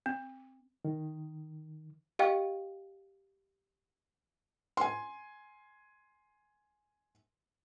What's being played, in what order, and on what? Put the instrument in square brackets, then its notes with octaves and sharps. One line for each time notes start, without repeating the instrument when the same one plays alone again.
[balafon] C4
[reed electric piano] D#3
[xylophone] G4 D#5 F5 G5
[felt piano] G#5 C6